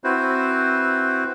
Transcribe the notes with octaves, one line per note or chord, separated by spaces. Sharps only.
C4 E4 F#4 B4 C5